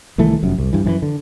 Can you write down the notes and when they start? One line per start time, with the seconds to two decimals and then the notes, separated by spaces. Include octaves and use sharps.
0.18 C2 D#3 E3 A3
0.43 F1 F#2
0.58 C2
0.73 G2 E3
0.85 F#2 D#3 E3
1.02 D3